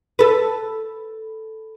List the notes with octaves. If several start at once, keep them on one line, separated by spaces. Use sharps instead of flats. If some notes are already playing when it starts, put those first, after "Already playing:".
A4 B4